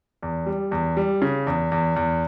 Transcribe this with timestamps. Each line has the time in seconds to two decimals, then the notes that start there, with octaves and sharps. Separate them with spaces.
0.23 E2
0.46 G3
0.71 E2
0.97 G3
1.22 C#3
1.47 E2
1.72 E2
1.96 E2